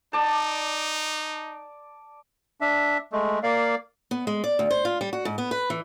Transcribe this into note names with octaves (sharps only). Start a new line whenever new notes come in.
D#4 D5 A5
D4 E5
G#3 A3
A#3 D5 F5
B3
G#3
D5
D2
C5
F4
G3
F#4
G#2
B3
B4
E3